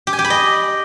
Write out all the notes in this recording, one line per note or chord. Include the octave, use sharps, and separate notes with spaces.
G4
G#5
G4
B5
D#5